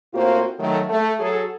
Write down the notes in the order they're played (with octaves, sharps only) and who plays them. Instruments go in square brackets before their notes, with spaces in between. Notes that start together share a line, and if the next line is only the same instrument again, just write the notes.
[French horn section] A2 A#3 C4 F4 F#4 C5
D#3 F#3 A3
A3
F#3 G#4 A4